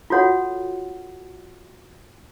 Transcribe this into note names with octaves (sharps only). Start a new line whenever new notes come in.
F4 F#4 A4 C#5 F#5